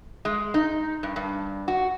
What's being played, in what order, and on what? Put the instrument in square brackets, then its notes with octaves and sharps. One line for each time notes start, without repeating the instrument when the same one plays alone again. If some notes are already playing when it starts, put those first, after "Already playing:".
[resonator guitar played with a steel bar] G#3
D#4
G2
G2
F#4